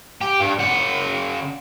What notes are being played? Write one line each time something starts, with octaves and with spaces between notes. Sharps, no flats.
G4
G2
C#3 F#5